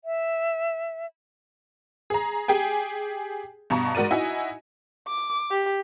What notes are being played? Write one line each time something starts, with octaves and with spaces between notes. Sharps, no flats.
E5
G#4 A#5
G4 G#4 G5 G#5
G2 B2 A5 A#5 C#6
G#2 F#4 A#4 D5 D#7
D#4 E4 F#4 G#5
D6
G4